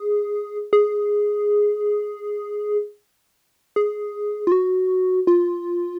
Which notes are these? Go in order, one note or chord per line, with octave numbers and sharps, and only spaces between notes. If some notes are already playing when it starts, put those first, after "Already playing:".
Already playing: G#4
G#4
G#4
F4
F#4
F4